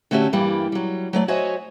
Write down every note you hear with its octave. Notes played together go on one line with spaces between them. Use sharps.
D3 A3 C#4 F#4 G4 E5
G2 E3 G3 A#3 G4
F#3 G3
F#3 A3 C#5 D5
F#4 C5 C#5 D#5 E5 G#5